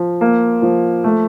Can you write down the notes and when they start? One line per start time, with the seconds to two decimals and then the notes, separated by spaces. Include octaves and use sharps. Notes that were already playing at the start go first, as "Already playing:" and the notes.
Already playing: F3
0.21 A#3
0.62 F3
1.04 A3